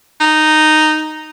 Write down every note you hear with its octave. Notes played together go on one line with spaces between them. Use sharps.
D#4